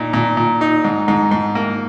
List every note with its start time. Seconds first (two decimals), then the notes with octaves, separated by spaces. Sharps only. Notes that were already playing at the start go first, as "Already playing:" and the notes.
Already playing: A#2 D#4
0.13 A#2
0.37 A#2
0.61 D#4
0.84 G#2
1.08 G#2
1.31 G#2
1.55 A#3